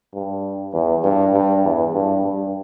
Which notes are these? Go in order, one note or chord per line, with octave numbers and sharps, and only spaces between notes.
G2
E2
G2
G2
E2
G2
G2